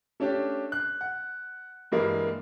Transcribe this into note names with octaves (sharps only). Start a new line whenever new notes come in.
A3 C#4 D4 G4
F#6
F#5
G2 E3 G3 G#3 A#3